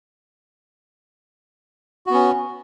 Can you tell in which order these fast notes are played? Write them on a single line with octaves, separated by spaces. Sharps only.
F#4 B3 C#4